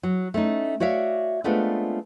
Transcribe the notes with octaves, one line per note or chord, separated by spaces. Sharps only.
F#3
A3 C#4 D#4
F#4 C#5 D5 E5 F5
G#3 A3 B3 C4 D4 F4